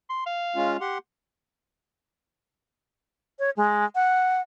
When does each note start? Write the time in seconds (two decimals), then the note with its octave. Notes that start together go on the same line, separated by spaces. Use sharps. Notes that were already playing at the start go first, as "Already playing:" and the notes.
0.09 C6
0.26 F5
0.56 G#3 C#4 F4
0.81 G4 F#5 C6
3.39 C#5
3.57 G#3
3.95 F#5